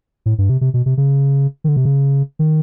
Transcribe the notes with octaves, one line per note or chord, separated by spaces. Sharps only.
A2
G2
C3
C3
B2
C3
C#3
D#3
D3
C3
C#3
D#3